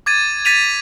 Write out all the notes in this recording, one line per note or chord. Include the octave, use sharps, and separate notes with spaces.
D6 G#6 A6 D#7
G#6 A6 B6 D#7 F7